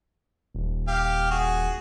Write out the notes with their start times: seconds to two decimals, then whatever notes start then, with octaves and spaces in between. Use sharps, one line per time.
0.54 D#1
0.88 G4 F5
1.31 F#4 G#4